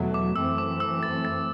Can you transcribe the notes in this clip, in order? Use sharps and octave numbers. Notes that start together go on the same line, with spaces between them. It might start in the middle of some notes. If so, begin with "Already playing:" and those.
Already playing: E2 B2 F#3 A3
D6
F#2 E3 A3 C4 E6
D6
E6
A6
A6